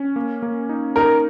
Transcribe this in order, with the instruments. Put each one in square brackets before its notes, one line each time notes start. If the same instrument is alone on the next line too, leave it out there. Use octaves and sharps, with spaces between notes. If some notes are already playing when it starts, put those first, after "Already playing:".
Already playing: [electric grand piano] C#4
A#3
A#3
D#4
[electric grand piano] D#4 [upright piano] A#4